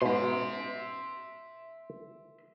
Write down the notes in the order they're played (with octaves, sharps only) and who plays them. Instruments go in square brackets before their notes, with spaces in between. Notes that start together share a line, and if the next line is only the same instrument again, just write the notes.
[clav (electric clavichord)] G#2 B2 [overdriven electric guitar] E5 C6